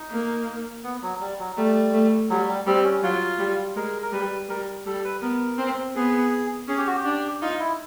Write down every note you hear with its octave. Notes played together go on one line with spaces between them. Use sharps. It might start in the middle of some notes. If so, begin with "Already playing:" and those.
Already playing: D#4
A#3
B3
F#3
G3
F#3
G3 A3
A3
F#3 G3
G3
G3 C4
C#4
F#3 F4
G3
G#3 A#4
A#4
G3 B4
G3 A#4
G3 A4
B4
B3 A#4
C4
B3 G#4
C#4 G#4
G4
F#4
G4
D4
D#4 F4
E4